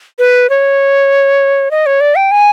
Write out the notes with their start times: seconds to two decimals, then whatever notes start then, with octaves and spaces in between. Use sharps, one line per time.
0.19 B4
0.50 C#5
1.71 D#5
1.86 C#5
2.01 D5
2.16 G5
2.31 G#5